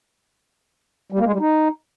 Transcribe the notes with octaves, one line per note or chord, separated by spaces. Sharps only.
G3
A#3
G#3
G3
D#4